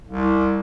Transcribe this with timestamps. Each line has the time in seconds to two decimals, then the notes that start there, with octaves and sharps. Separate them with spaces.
0.08 C2